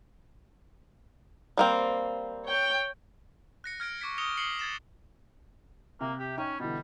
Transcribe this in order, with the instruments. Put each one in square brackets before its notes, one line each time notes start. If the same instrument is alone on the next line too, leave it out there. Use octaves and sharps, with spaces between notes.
[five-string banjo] G3 A#3 C4
[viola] C#5 G5
[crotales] F#6 A#6 C#7
F6 G#6 A#6 D7
C#6 D6 G#6 B6
D#6 A#6 C#7 F7 G7
D#6 C7 C#7 F#7 G7
G#6 A6 E7
[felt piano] C3 [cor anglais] A#3
[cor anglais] G4
[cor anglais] C#4 [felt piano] D#4 G5
[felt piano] B2 D3 E3 [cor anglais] G3